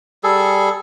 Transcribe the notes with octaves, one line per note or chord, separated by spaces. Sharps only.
G3 G#4 A4